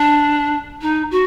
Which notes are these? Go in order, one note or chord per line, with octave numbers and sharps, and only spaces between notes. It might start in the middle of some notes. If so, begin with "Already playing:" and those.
Already playing: D4
D#4
F#4